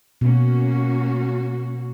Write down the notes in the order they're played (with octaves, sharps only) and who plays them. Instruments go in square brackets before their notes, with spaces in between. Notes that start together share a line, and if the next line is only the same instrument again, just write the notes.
[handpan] B2 [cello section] A#3 C#4 F#4